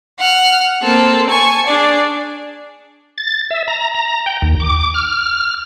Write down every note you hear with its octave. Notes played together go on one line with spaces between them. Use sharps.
F#5 F6
A#3 C4 A4
G#5 A5 C#6
D4 G#4 D5
A6
E5
A#5
A#5
G5
D#2
D6
F6